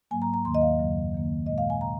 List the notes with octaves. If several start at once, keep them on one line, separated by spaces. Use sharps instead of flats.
G#2 F#3 A#3 G#5
A#5
A#5
D#2 D#3 A#3 C6
D#5
F5
F#2 C#3 F#3 A#3
F#2 D#3 A#3
A#2 G#3 D#5
F5
G#5
C3 A#5